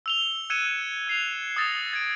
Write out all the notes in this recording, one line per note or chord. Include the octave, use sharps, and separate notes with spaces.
E6 F7 G7
E6 F#6 G#6 C#7 D#7 E7
F#6 C7 F7
D#6 E6 A6 A#6 E7 F7
G#6 D7